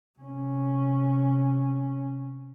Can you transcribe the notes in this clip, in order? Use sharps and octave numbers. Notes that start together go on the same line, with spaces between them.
C3 C#4